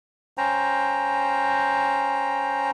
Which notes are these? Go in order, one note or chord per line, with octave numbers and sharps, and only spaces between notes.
C#4 C5 G5 A#5